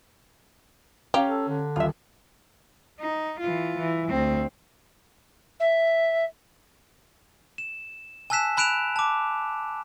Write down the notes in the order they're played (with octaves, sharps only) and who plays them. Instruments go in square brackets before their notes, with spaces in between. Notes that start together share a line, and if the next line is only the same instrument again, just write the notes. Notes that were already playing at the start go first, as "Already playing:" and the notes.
[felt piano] C#4 [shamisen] G4 [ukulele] F5 A#5
[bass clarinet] A4
D3
[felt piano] D#1 [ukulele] F4 E5
[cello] D#4
E3 F4
E3
D2 C4
[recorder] E5
[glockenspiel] E7
G#5 A5 E6 F#6 B6 E7
G#5 B5 F#6 D7 E7 F7
A5 D6